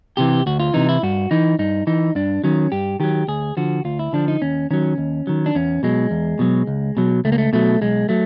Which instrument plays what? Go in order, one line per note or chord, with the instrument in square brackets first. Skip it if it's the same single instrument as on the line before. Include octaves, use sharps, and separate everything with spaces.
[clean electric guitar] C3 E3 G4
D2 F#4
F4
C3 E3 D#4
E4
G2 F#4
E3 D#4
G2 D#4
E3 D#4
G2 D4
D#3 F#3 C#4
G2 G4
D#3 F#3 G4
D2 G#4
D3 F3 F#4
D2 F4
E4
D3 F3 D4
D#4
D#2 C#4
D#3 F#3 C#4
D#2
D#3 F#3
D4
E2 C#4
B2 F#3 G#3
E2
B2 F#3
C#2
B2 F#3
C#2 A3
A#3
A3
B2 F#3 A3
B1 G#3
F#3 A3